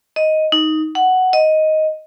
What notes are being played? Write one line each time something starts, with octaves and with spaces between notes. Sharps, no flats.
D#5
D#4
F#5
D#5